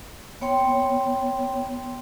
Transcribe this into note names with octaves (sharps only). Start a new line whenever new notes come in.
B3 C#5 G5 C6